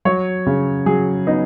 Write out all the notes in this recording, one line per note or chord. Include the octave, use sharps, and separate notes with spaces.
F#3 C#5
C#3
F#3 G#4
B3 D#4